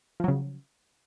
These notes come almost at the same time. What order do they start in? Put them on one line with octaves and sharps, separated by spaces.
F3 F#3 C#3